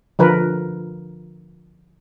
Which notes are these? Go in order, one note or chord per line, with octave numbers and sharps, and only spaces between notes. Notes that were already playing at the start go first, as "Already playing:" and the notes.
D3 F3 A#4 B4